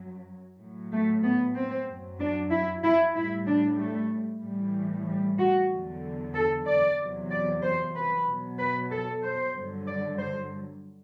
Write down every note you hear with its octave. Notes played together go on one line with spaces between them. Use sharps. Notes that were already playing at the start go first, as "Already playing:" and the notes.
Already playing: F#2 F#3
A2 F#3
A3
B3
C4
F#2 F#3
D4
E4
E4
A2 G3 E4
D4
A3
A2 E3 G3
G3
F#4
E2 D3 F#3
A4
D5
E2 C3 F#3
D5
C5
B4
B2 F#3
B4
A4
C5
G2 D3 F#3
D5
C5